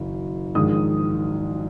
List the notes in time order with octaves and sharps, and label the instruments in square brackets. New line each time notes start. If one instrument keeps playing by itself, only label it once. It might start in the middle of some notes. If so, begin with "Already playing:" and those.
Already playing: [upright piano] F#1 F#2 D#3
A#1 G#2 D#3 G#3 D#6